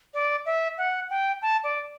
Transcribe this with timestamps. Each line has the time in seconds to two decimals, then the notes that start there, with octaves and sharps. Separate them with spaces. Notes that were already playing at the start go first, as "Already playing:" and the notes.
0.14 D5
0.46 E5
0.78 F#5
1.10 G5
1.42 A5
1.64 D5